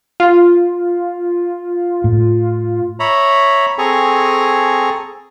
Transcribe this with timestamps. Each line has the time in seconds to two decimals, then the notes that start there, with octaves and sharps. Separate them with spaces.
0.20 F4
2.04 A2
3.00 C#5 E5 A#5 B5
3.78 C4 G#4 A4 G#5 A#5 C#6